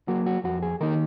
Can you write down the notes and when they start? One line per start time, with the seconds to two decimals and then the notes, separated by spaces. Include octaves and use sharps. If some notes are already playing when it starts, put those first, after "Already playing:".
0.08 F#3 A#3 F#4
0.26 F#4
0.44 F2 F#4
0.62 G#4
0.80 D#3 A#3 D#4 A#4